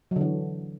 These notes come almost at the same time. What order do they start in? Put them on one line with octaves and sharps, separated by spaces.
F#3 D3 E3